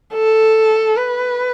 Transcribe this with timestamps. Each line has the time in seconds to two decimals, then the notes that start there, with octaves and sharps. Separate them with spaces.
0.14 A4
0.97 B4